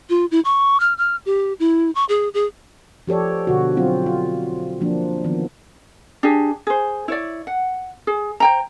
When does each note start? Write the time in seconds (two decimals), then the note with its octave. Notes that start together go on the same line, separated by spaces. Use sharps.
0.09 F4
0.31 E4
0.45 C#6
0.80 F6
0.98 F6
1.26 G4
1.60 E4
1.95 C#6
2.09 G#4
2.34 G#4
3.07 F3 G4 A4 C#5 D5
3.47 B2 D3 F#4
3.77 F#3 C4 F4
4.06 F4
4.81 F3 A#3 D4
5.24 D#3 F3 B3
6.23 D4 G4 G#4
6.67 G#4 C5
7.08 E4 C#5 D5
7.47 F#5
8.07 G#4
8.40 C5 G5 A#5